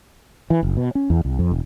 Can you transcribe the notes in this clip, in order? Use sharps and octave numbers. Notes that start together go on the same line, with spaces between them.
E3
F#1
B2
C#4
E2
C2
F2
E1